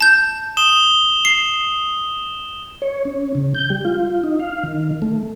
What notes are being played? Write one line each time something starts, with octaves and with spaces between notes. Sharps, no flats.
A5 G6
D#6 E7 G7
C7
C#5
C#4
C#3
G6
G3
F4
D#4
F5
D#3
A3